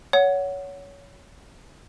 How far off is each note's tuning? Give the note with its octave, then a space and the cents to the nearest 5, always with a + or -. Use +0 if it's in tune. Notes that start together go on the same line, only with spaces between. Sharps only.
C#5 +20 F#5 +0